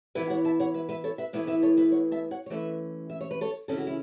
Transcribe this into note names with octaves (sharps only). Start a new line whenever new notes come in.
E3 B3 E4 B4 E5
C#5 F#5
E5 A5
C#5 F#5
B4 E5
B4 E5
A4 C#5
B4 E5
A2 E3 B3 E4 B4 E5
B4 E5
A4 C#5
B4 E5
C#5 F#5
E5 A5
C#5 F#5
C#5
E3 A3 C#4 B4 E5
E5
C#5
B4
A4 C#5
C#3 E3 C#4 E4 A4
F#4
E4